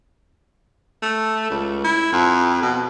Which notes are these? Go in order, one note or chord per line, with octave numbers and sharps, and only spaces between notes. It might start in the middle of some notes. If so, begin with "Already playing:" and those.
A3
C#2
E4
F2
B2